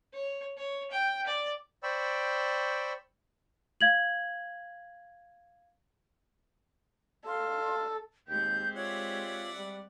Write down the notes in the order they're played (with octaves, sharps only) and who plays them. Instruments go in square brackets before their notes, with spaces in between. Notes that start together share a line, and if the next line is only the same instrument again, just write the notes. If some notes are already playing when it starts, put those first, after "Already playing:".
[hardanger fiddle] C#5
C#5
G5
D5
[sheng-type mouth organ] C5 D5 G5 B5 C#6 E6
[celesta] F5 G#6 F#7
[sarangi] A4 [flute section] F5 C6 F6
[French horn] D#2 [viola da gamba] G#3 C4 G4 [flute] G6
[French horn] F4 [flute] C#5 [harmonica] D5 E5 F#5
[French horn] G3